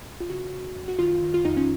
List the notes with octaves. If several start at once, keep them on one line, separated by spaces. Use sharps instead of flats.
F4
C#3 F#4
C#3
F#2
F#4
D#3 F4
D#3
F4
F2 D#4
C#4